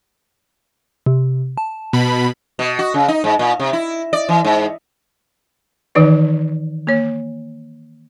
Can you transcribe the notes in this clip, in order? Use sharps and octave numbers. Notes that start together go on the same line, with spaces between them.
C3
A5
B2 B5
B2
F#4
C#3
D#4
G#2
A#2
C3
E4
D5
E3
G#2
D#3 E3 D#4 B4 D5
A#3 C#5